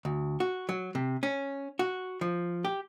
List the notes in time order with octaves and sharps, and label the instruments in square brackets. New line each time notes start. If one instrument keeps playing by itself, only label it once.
[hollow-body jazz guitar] D2
F#4
F#3
C3
C#4
F#4
F3
G4